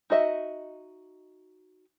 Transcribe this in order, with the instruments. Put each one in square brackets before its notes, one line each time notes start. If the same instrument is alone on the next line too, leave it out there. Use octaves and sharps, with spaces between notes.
[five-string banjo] D#4 F#4 D#5 E5